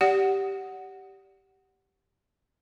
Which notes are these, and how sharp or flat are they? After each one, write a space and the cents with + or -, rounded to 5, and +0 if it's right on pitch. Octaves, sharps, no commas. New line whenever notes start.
G4 -10 D5 -20 F#5 +0